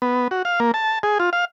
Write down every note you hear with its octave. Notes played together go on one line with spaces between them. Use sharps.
B3
F#4
F5
A#3
A5
G#4
F4
F5